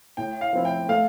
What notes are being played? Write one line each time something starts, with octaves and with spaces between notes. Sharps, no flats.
A2 G5
F5
F3 C4 E4
G5
A3 F5